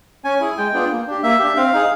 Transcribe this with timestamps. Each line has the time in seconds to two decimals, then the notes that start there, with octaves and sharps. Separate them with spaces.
0.24 C#4 G#5
0.40 E4 G#4
0.57 G#3 G5
0.73 B3 D4 F4 G#4
0.91 A#3
1.07 D4 G4
1.23 A#3 E5
1.39 D4 G4
1.56 C4 F5
1.73 D#4 G#4